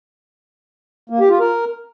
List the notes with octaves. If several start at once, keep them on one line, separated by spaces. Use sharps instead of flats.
A#3
G4
F4
A#4